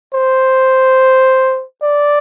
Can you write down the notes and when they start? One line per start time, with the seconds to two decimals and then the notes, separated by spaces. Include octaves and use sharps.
0.13 C5
1.82 D5